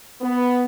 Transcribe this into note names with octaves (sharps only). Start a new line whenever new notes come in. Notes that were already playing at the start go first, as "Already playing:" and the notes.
B3